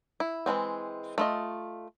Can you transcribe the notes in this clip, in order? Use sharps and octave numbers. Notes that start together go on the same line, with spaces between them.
E4
E3 F3 G#3 C4
A3 F4 D#5